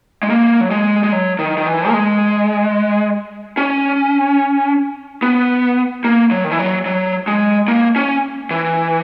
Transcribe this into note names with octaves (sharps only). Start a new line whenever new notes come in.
G#3
A#3
F#3
G#3
G#3
F#3
D#3
D#3
E3
A#3
G#3
C#4
B3
A#3
F#3
D#3
E3
F#3
F#3
G#3
A#3
C#4
E3